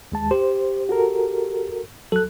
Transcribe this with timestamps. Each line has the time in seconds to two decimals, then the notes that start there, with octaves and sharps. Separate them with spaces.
0.12 D#2 G#3 A5
0.31 G4 C5
0.89 F#4 A4 A#4
2.12 F#3 A4 F#6